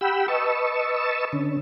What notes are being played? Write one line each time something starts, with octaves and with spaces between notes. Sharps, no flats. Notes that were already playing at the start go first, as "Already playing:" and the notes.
G4 F#5 G5 B5 E6
B4 D#5 A5 C#6 E6
D3 C#4